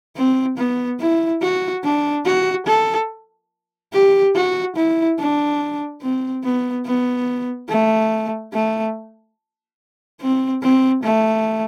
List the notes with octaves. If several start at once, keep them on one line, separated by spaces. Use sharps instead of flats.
C4
B3
E4
F#4
D4
F#4
A4
G4
F#4
E4
D4
C4
B3
B3
A3
A3
C4
C4
A3